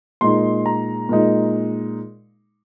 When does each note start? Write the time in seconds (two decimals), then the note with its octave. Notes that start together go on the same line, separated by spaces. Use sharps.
0.21 A#2 G#3 D#4 C6
0.66 A#5
1.09 A#2 G#3 D#4